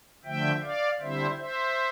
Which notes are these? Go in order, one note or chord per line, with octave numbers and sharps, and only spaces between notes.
D3 F3 A3 E5 G5
D5 F5
D3 G3 C4 E4 C5 E5
C5 E5